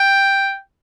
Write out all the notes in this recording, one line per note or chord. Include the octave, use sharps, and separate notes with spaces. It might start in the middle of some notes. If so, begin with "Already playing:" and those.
Already playing: G5